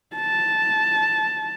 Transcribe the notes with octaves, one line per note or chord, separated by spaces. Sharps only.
A5